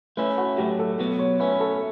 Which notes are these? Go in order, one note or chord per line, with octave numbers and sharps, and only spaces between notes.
A3 C#4 E4 B4
F#4
A2 F#3 A3 G4
A4
B2 F#3 B3 F#4
C#5
A3 C#4 E4 B4
A4